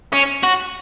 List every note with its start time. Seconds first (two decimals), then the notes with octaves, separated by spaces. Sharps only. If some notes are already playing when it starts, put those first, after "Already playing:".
0.13 C#4
0.43 F#4